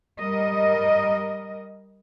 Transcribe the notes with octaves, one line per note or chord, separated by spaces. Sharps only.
G3 A#4 D#5